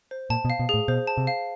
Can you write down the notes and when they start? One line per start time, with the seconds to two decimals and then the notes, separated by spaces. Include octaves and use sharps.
0.11 C5
0.30 A#2 A5
0.45 B2
0.50 F5
0.59 B2
0.69 A2 G#4
0.88 B2 C5
1.07 A5
1.17 C3
1.27 F5